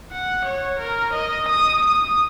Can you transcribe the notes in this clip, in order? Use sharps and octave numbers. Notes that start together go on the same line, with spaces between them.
F#5
C#5
A#4
D#5
D#6
D#6